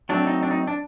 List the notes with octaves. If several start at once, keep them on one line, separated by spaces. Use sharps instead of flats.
F#3 A3 C4 D4
D#4
D4
D#4
D4